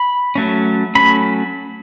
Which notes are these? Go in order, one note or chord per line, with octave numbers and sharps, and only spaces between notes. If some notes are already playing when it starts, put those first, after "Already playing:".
Already playing: B5
F#3 A3 C#4
F#3 A3 C#4 B5